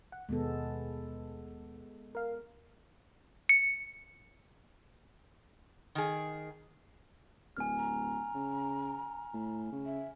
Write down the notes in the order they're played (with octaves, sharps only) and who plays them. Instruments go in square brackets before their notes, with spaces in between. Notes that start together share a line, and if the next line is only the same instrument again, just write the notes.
[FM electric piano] F#5
[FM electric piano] D#2 B2 [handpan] G#3 B3 A4
[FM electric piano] A#4 F5
[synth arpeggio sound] C#7
[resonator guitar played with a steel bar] D#3 G#4
[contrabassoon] D1 [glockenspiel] G#5 F6
[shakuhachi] A#5
[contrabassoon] C#3
A2
C#3
[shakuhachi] E5